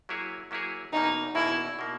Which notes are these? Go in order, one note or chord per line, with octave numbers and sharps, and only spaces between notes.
F#3 A#3 E4 G#4 C#5
F#3 A#3 E4 G#4 C#5
E2 B2 A#3 D#4
E2 B2 A#3 E4
B2 A#3